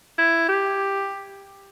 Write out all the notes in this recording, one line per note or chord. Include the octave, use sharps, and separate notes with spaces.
E4
G4